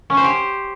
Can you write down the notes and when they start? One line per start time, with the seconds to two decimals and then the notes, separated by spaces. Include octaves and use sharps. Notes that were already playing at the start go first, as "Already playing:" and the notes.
0.10 C#4
0.17 C5
0.24 G4